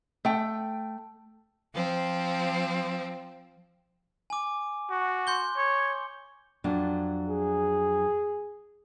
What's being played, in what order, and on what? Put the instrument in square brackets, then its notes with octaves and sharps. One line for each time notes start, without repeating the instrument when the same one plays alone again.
[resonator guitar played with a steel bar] A3 G5
[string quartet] F3 C4
[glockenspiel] G#5 D6
[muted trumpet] F#4
[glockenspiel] C6 G6 G7
[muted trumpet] C#5
[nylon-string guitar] F2 F#3 D4
[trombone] G#4